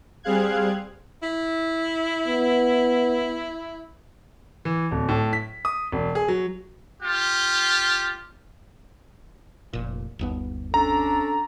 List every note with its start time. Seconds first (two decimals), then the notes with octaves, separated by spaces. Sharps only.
0.23 G3 C4 G#4 F5 F#6 G#6
1.23 E4
2.28 B3
4.65 E3
4.91 D1
5.09 A2
5.33 B6
5.65 D#6
5.92 E1
6.15 G#4
6.28 F#3
7.02 F4 G4
9.73 F1 A#2
10.19 G1 D#2 B3
10.74 C#4 D4 A4 A#5